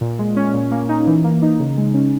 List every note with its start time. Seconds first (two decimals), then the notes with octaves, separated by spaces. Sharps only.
0.01 A#2
0.19 G#3
0.37 C#4
0.53 A#2
0.71 A#3
0.89 D#4
1.07 E3
1.24 A#3
1.42 D#4
1.59 C#3
1.77 G#3
1.94 C#4